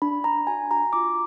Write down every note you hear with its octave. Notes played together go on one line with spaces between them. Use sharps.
D4 B5
D4 A#5
F#4 G#5
F#4 A#5
F4 D6